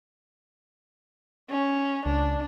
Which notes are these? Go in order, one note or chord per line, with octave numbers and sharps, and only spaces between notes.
C#4
C#2 D4